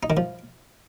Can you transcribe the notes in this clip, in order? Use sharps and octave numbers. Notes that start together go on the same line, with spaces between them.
D#4
D#3
F3